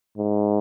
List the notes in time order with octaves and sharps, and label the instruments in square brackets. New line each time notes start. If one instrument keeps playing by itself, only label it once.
[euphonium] G#2